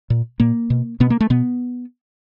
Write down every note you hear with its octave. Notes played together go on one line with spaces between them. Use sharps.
A#2
A#2 A#3
B2
B2 B3
A#3
A3
B2 B3